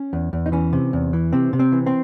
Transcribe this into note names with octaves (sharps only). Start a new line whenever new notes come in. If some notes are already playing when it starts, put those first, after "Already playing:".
Already playing: C#4
E2
E2
D#4
E3 C#4
C3
E2
E3
C3 C4
C3
C4
E3
C4